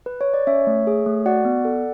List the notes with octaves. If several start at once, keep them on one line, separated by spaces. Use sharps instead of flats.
B4
C#5
D5
C#4 C#5 E5
A3
G#4
A3
F#4 D5 F#5
B3
A4